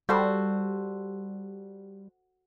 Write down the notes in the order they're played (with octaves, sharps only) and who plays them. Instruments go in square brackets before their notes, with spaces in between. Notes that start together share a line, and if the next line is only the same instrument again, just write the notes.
[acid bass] G3 [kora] F#4 A4 C5